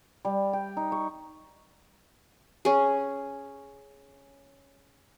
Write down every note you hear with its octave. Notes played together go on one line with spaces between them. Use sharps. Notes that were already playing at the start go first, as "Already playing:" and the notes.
G3
G5
D#4
C#6
C#4 G#4